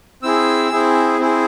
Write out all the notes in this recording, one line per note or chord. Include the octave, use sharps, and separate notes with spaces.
C4 E4 G#4 E6
C4 E4 G#4
C4 E4 G#4